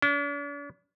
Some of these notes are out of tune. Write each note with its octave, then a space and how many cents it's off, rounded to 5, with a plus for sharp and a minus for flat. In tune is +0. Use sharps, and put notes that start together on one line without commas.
D4 -45